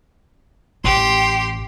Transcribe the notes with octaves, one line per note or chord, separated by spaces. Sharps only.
A1 G4 C6